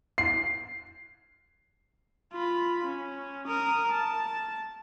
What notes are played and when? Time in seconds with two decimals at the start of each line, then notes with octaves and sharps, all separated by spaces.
0.18 C7
2.33 F4 B5
2.84 C#4
3.47 A#4 D#6
3.92 A5